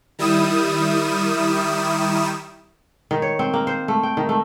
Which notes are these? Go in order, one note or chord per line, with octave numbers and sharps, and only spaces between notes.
D#3 G3 E4 D#6 E7
D#3
C#5
C4
A#3
C5
A3
G5
D#3
A3